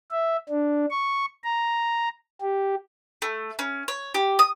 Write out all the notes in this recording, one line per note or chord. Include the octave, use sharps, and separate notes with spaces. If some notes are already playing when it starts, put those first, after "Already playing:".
E5
D4
C#6
A#5
G4
A3
C#4
C#5
G4
D#6